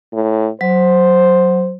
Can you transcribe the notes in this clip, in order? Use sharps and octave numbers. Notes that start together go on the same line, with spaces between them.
A2
F#3 C5